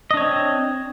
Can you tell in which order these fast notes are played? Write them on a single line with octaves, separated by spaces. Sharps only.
D#5 D4 C#5 C4